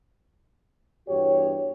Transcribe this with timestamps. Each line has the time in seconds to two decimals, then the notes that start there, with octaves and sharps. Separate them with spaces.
1.08 E2 G2 F#4 G4 C#5